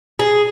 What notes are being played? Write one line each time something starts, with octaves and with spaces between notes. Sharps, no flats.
G#4